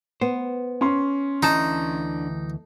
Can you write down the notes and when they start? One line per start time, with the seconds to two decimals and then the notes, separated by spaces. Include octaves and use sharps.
0.21 B3 C5
0.81 C#4 C6
1.43 D2 D3 E3 D#4 A5